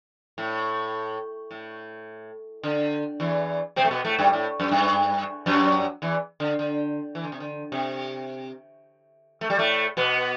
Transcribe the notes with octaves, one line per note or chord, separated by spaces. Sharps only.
A2
A2
D3
E2 E3
C3 C4
A3
B2 B3
A2 A3
G2 G3
A2
F#2
G2
F#2 F#3
E2 E3
D3
D3
E3
D3
C3
D3
C3
A3
G3
A2 A3
B2 B3